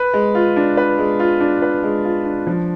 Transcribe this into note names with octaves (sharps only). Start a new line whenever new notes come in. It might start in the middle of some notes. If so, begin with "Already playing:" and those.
Already playing: B4
G#3
F4
D4
B4
G#3
F4
D4
B4
G#3
F4
D4
F3